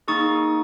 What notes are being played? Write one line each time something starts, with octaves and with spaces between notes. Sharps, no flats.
A#3 D#4 G#4 C#6 D#6